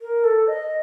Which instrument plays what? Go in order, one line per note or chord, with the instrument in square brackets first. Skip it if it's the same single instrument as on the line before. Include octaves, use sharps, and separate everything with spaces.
[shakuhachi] A#4
A4
D#5